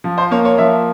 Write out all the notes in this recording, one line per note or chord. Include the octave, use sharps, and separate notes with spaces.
F3
C5
A#3 C#5
C#5
F3 E5